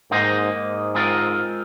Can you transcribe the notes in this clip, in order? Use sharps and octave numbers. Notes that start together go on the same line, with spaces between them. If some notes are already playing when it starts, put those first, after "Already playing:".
G#2 A#3 D#4 C5 D#5
G#2
G#3 C4 F4 A#4 D#5